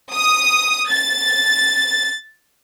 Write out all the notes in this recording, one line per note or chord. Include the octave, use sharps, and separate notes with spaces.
D#6
A6